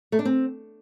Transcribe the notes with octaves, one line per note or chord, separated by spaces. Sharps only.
A3
D4
C4